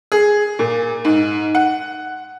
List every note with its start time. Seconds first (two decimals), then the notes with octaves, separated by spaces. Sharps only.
0.12 G#4
0.59 A#2
1.05 G#2
1.55 F#5